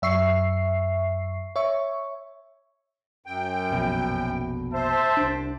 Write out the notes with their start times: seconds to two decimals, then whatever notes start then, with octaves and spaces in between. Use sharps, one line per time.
0.02 F#2 E5 C#6 C7
1.56 C#5 E5 C#6
3.26 F#2 G5
3.70 F1 A#1 B2
4.74 C5 E5 A5
5.17 C2 D4